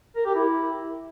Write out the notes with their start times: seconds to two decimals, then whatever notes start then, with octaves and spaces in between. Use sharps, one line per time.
0.16 A#4
0.26 G4
0.35 E4